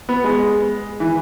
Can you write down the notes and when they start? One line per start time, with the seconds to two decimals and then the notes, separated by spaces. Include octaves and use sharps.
0.09 B3
0.24 G#3
1.00 E3